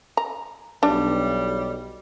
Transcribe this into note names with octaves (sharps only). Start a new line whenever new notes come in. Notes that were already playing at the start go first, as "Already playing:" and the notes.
A#5
B1 G3 D4